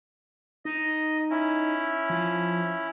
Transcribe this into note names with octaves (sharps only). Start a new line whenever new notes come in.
D#4 D#5
C#4 E4
F3